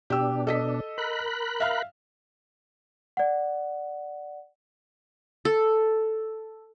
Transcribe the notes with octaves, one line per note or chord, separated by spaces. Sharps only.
B2 D4 G4 E6
A4 D#5 B6
A#4 B5 F#6
E5 F5 F6
D5 F#5
A4